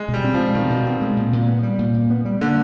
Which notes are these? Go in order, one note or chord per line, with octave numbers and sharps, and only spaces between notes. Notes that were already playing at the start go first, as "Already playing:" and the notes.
Already playing: G#3
B2
G3
C4
F3
G#3
B2 D#3
B2
C4
G#3
A#2
A#2
B3
G3
A#2
A#2
B3
G3
D3 A#3